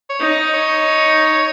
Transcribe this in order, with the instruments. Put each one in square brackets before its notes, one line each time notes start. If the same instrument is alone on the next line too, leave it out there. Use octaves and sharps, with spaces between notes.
[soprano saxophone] C#5
[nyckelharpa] D#4
[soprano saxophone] D#5
C#5